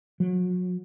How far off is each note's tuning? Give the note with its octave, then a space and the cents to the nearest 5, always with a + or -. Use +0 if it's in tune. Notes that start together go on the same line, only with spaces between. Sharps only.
F#3 -35